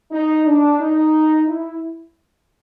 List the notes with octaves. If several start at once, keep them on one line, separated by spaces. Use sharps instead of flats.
D#4
D4
D#4
E4